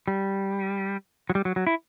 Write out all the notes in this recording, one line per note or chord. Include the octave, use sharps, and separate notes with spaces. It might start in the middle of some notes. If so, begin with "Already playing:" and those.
G3
F#3
G3
F#3
F#3
E4